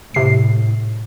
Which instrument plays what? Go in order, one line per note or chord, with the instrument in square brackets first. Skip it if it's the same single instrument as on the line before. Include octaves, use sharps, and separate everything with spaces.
[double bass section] A2 [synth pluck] C3 C7